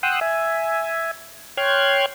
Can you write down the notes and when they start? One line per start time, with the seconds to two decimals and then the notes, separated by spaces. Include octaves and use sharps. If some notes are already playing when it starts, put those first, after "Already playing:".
0.03 F#5 G5 C6 D#6 E6 F#6
0.21 E5 G#5
1.57 C#5 G5 C6 F6 F#6 G#6